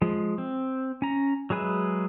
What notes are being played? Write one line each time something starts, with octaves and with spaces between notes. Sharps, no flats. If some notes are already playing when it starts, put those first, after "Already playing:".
F3 G#3
C4
C#4 A#5
F#3 G#3 G#4 B4 E5